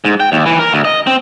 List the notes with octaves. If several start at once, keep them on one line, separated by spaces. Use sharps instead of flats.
G#2
G5
D#2
E3
A#4
D2
D#5
C4